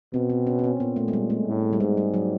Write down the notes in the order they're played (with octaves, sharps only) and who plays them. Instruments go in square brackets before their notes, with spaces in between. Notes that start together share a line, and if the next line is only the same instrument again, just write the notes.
[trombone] B2 [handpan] C4
[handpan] C4
C#4
C#4
C4
[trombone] A#2 [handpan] B3
[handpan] A3
G#3
G3
A3
[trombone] A2
[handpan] G3
[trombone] G#2 [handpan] G#3
[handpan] G3
F#3